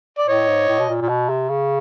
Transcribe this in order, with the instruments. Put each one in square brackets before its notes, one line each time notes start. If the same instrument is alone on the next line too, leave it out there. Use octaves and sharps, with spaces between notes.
[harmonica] D5
[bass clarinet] A2 [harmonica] C#5 D#5
[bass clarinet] G#2
A2
B2
A#2
A#2
B2
C3
C#3